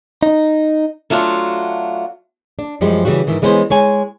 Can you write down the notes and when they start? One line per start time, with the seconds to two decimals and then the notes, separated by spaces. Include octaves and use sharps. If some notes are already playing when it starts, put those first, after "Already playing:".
0.23 D#4
1.10 F#3 A3 D4 F4 F#4
2.59 D4
2.81 F#2 F3 G3 G#3
3.05 C#3 E3 G3 F#4
3.27 G#2 D#3 E3
3.42 E3 G#3 B3 C#4 B4 C5
3.70 G#3 C#5 G#5